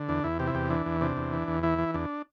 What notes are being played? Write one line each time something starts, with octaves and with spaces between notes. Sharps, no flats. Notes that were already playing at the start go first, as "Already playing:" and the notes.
Already playing: D3
E2 D4
E2 E4
C3 G4
E4
E2 G4
E3 D4
E2
C3 D4
E2
E3
E2
E3 E4
E3
E2 D4